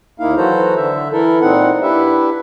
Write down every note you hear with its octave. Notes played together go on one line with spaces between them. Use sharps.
D#2 A#3 D#4 E4 F5
E3 F#3 F#4 A4 C5 A#5
D3 E5
E3 E4 A4 A#4
A#2 C4 D#4 F#5
D4 E4 G4 B4 E5